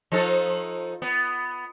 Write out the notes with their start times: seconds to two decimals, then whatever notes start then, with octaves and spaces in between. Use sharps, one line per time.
0.12 F3 D#4 A4
1.02 B3